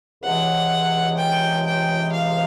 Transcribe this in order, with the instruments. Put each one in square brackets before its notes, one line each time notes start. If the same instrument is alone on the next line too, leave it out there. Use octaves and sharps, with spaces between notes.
[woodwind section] C#2 C3 E3 G#3 [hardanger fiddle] F#5
[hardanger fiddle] G5
G5
F5